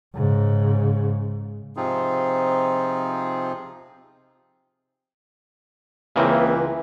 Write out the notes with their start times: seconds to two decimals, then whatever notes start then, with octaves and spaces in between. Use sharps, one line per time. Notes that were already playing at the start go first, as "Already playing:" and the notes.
0.15 G#2 C#3
1.77 C3 F3 C4 D#4 F4 G#4
6.16 C#2 C#3 E3 A#3 C4